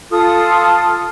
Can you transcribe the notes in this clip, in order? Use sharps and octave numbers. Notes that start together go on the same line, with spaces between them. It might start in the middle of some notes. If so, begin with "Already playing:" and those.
F4 A4 D#6